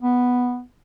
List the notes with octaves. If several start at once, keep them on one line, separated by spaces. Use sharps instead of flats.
B3